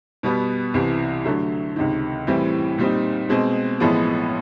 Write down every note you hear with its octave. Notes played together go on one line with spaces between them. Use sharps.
B2 G3 B3
C2 C3 E3
D3 F#3 A3
C#2 C3 D#3
A2 E3 G3 C4
A#2 G3 C4 D#4
B2 G#3 C4
A1 A2 F3 G#3 B3